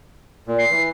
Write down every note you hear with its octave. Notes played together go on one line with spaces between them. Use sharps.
A#2
C7
E3